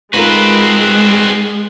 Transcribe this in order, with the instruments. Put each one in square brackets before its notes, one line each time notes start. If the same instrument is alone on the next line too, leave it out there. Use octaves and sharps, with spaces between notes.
[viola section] G#3 [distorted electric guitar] C4 F#4 [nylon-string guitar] D#4 F4 A#4 [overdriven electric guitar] B4